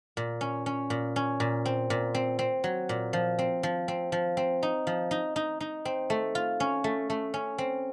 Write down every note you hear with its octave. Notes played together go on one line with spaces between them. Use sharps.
A#2
C#4
C#4
A#2
C#4
A#2
C4
A#2
C4
C4
F#3
A#2
F3
C4
F3
C4
F3
C4
D#4
F3
D#4
D#4
D#4
C4
A3
F4
C#4
A3
A3
C#4
C4